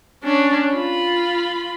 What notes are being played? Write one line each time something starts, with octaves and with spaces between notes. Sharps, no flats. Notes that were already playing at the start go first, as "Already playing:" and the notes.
C#4 D4
F4 B5